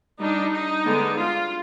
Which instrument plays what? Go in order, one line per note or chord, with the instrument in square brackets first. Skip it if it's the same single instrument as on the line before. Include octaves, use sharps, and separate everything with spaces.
[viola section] G3 D4 D#4
D#4
D3 G#3 B3 D4
F4